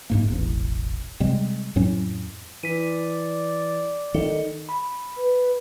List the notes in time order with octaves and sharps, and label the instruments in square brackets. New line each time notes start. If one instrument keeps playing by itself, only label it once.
[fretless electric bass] F#1 G#2 A#3
E1 A1
C3 G3 G#3 C4
F2 A2 F#3 C#4
[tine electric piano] E3 [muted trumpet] D5 [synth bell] B6 D#7
[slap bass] D#3 [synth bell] A4
[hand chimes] B5
[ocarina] B4